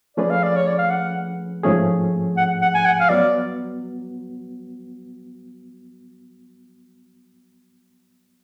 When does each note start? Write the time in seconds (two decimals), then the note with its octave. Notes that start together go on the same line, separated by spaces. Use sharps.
0.17 F3 A3 C#4 G#4 B4 D5
0.30 F5
0.43 D5
0.56 C#5
0.67 D5
0.79 F5
0.90 F#5
1.63 G#2 F3 A3 C#4 G#4
2.37 F#5
2.61 F#5
2.75 G#5
2.85 F#5
3.00 F5
3.10 F#3 B3 F#4 D5